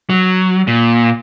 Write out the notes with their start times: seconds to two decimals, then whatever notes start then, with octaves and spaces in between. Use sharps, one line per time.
0.10 F#3
0.67 A#2